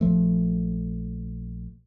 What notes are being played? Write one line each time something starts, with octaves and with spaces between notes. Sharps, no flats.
A#1 F3 A3